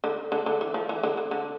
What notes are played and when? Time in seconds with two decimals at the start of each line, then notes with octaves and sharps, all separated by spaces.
0.04 D3
0.32 D3
0.46 D3
0.61 E3
0.74 F3
0.89 E3
1.03 D3
1.17 D3
1.31 D3